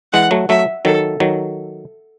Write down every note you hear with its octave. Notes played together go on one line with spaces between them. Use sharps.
E3 G#3 F#5
F#3 A3
F#3 A3 E5
D#3 F#3 A4
D#3 F#3